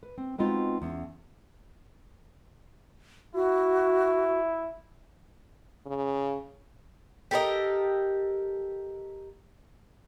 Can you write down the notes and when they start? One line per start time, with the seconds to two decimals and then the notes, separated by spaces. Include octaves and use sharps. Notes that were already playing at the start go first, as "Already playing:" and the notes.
0.03 B4
0.18 C4
0.38 G#3 B3 C4 D#4 F4 F#4
0.82 E2 C#4
3.35 E4 F#4
5.86 C#3
7.31 G4 A4 A#4 D#5